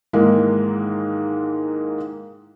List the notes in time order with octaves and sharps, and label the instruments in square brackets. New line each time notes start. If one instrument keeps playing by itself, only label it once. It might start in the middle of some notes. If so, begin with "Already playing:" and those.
[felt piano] G#2 D#3 E3 G#3 A#3